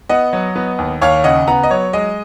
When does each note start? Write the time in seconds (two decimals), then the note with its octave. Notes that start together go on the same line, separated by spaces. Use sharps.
0.09 B3 D#5 F#5
0.33 F#3
0.56 B3
0.78 D#2
1.01 D#2 C#5 F5
1.24 C#3 D#5 F#5
1.47 B3 F#5 A#5
1.63 D#5
1.70 F#3 C#5
1.93 G#3 D#5